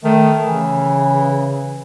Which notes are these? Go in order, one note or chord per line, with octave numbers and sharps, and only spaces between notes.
D#3 A3
C#3 E3